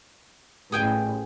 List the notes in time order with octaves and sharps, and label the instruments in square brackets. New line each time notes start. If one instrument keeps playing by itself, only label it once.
[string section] A1 [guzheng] G#4 G5 G#5